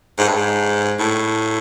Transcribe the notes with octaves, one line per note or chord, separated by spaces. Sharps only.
G#2
G2
G#2
A2